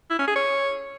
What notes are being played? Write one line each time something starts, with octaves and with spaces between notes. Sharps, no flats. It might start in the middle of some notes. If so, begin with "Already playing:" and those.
E4
C#4
G#4
C#5